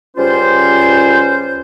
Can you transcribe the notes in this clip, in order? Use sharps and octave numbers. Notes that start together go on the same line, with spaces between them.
C#2 G3 C#4 F4 C5